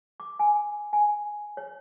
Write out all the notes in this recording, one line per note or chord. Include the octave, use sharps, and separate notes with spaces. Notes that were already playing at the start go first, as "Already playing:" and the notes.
D6
G#5
G#5
C#5